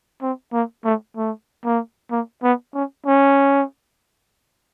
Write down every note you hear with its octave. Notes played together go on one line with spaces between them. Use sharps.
C4
A#3
A3
A3
A#3
A#3
B3
C#4
C#4